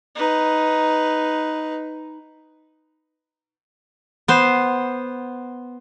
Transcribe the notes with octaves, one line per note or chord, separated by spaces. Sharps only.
D#4 B4
B3 C5